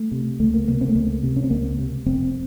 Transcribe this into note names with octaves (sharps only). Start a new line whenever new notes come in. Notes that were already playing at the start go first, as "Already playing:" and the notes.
Already playing: A3
C3
C#2 A3
A#3
C3 A#3
C4
A3
C#2 A#3
C3
C#4
C4
C#2 A#3
C3
F1 C4